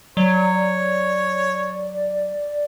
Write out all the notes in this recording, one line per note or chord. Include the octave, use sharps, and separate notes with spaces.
F#3 C#5 D5